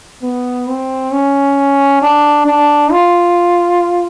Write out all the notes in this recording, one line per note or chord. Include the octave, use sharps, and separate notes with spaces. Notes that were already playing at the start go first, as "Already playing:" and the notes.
B3
C4
C#4
D4
D4
F4